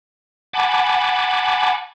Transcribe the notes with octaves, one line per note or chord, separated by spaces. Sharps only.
F#5 G#5 A5 B5 D6